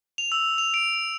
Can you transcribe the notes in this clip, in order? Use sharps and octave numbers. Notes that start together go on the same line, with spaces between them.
F7
E6
F7
D7